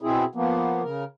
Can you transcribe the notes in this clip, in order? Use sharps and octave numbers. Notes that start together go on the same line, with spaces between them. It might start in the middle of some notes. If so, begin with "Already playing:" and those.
B2 C4 E4 G#4
F3 A#3 B3
C#3 A#4